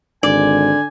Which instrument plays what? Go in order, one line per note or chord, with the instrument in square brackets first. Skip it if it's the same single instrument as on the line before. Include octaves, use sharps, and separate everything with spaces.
[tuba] G#1 [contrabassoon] D3 [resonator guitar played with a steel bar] D5 [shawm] G#5